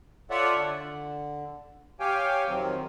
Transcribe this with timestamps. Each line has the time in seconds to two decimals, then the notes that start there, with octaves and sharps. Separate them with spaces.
0.30 F4 A4 C#5 D5 E5 F#5
0.54 D3
2.00 G4 C#5 F5 G5 G#5
2.48 F2 C3 D#3 F#3 C4